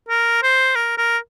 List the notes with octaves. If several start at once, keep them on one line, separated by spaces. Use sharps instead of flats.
A#4
C5
A#4
A#4